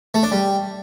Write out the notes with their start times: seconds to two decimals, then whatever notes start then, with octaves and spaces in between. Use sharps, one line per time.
0.14 A3
0.23 D4
0.32 G3